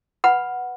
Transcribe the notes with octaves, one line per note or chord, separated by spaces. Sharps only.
B4 F#5 B5